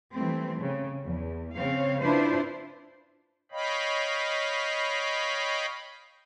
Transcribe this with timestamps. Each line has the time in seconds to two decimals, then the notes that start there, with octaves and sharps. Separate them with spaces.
0.14 E3 G3 A3 C4
0.59 C#3
1.04 E2
1.55 C#3 C4 C#5 F5
2.01 D4 E4 F4 B4 C5
3.52 C#5 D#5 F5 G5 B5